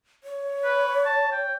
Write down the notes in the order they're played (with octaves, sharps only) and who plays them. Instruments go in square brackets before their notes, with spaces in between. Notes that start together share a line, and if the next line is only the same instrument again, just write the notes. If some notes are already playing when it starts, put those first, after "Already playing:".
[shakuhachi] C#5
[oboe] B4
A5
G5